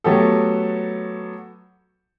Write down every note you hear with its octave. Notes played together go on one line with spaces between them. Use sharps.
F#3 A3 B3 G4 A4